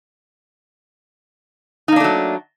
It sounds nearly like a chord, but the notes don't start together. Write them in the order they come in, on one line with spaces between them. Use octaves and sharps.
D#4 A#3 D4 A3 F#3